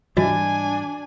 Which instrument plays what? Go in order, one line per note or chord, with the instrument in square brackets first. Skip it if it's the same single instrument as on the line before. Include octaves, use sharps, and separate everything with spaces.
[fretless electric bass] G#2 E3 G3 [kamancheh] D4 G#5 [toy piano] F#4 D#5